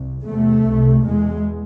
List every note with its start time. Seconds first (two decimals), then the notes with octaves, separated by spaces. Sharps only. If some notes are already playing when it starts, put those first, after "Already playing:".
Already playing: C2
0.25 E2 C3 A3
0.65 C2 C3
1.05 E2 B2 G#3